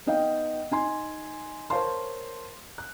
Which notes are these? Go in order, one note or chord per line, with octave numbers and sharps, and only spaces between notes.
B3 D#4 D#5 F5 G5
D#4 G#5 C6
A#4 C5 C#5 F5 A5 C6
F#6